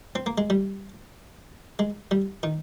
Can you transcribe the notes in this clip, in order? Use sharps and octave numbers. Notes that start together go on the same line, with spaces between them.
C4
A#3
G#3
G3
G#3
G3
D#3